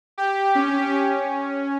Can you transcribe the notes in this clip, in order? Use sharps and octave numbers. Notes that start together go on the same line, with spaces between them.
G4
C#4
C#4